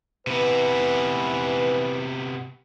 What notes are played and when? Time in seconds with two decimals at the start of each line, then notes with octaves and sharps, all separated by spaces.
0.27 C3 E3 B3 B4